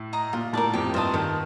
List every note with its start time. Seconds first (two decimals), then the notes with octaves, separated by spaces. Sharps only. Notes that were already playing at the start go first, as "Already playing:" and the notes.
Already playing: A2
0.13 D#5 A#5
0.33 A#2 F4
0.53 A2 A#4 D5 A5
0.73 F2 G4
0.94 G2 C5 D#5 A5
1.14 D#3 A4